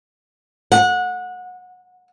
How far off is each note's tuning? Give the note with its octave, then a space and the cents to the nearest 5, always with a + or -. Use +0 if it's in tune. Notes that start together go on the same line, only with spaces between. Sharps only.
F#5 -25